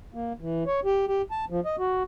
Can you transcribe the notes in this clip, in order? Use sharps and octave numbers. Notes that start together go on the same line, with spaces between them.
A#3
E3
C#5
G4
G4
A5
F3
D#5
F#4